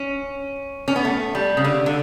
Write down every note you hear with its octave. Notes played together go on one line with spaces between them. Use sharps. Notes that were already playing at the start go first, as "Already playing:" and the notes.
Already playing: C#4
C#4
B3
A3
G3
C#3
D3
D3